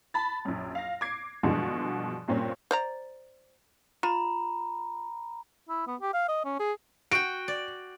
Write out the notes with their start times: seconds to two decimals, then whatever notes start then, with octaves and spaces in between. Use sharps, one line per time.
0.14 A5 B5 A6
0.45 A#1 F#2
0.75 F5 A#6
1.01 D6 G#6 C7
1.43 G2 B2 D3 E3 F3 G#3
2.28 G2 A#2 A#3 C4 C#4
2.71 C5 D5 A#5
4.03 F4 A#5 B5
5.69 E4
5.87 B3
6.01 G4
6.14 F5
6.29 D#5
6.45 C#4
6.60 G#4
7.11 F#4 G5 D7
7.48 D5